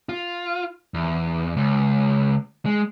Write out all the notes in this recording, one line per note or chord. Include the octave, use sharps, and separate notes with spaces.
F4
E2
C#2
G#3